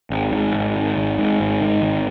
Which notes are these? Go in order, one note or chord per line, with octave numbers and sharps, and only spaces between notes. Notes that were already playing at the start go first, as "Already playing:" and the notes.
G#1
G#2
G#1
D#3
G#1
G#2
G#1
D#3
G#1